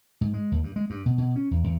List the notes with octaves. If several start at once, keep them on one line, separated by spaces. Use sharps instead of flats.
G#2
G#3
D#2
G2
G#3
G2
B2
B2
C#4
E2
E2